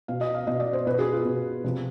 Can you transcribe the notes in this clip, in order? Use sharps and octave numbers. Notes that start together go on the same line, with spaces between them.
B2 F5
D#5
F5
B2 D#5
D5
C5
B2 B4
G#4
F4
B2
C3 F3